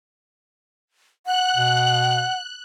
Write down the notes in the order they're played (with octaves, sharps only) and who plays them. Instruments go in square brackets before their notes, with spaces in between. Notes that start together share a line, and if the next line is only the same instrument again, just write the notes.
[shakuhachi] F#5 [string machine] F#6
[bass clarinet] B2